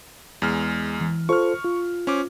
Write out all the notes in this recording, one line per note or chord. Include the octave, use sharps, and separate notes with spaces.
E2 G#3 F6
E3
F4 A4 C5 C#6 F6
F4
C#4 C5 D6